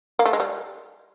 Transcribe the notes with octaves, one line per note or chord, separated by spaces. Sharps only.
A#3
A3
G#3
G3